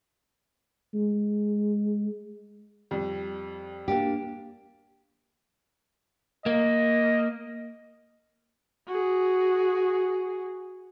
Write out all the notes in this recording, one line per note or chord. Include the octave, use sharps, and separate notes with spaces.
G#3
F2 G3
A#3 D4 G4
A#3 D#5
F#4 G#4